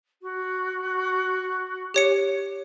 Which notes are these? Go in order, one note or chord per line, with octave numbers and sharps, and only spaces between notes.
F#4
G4 C#5 C#7